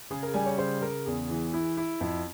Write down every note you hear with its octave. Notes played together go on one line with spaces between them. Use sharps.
C#3 G#4
A#4
G3 G#5
C#5
C#3 C5
C#3 A#4
E2 G#4
E3
E4
E4
F2